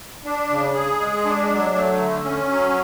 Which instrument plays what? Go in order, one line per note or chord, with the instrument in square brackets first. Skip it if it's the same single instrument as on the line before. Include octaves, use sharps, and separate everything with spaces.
[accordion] D4
C#3
G#4
G#3
D4
F#3
A3
D3
C#4
F#3